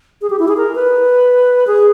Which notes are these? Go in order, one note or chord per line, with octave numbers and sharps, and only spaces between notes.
G#4
G4
E4
G#4
A#4
B4
G#4